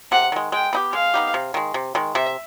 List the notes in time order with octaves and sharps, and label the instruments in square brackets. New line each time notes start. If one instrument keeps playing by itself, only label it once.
[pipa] C3 [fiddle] F#5
[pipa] D#3 G#3
[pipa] G#3 [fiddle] G5
[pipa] B3 D#4 G4
[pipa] G#3 [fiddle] F5
[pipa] B3 D#4 G4
C3
D#3 G#3
C3
D#3 G#3
[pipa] C3 [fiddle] E5